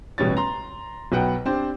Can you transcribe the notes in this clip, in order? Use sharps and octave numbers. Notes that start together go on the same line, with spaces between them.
A1 B2 G3 B3 C#5 A6
A#5 C6
B1 B2 B4 F#5 G5
C4 D4 G4 C5